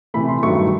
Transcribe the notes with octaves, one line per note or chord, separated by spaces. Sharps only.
C3 E3 A3 B5
C6
G2 D#3 F#3 A3 C#6